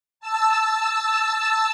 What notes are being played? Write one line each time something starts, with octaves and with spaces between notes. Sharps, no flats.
A5 E6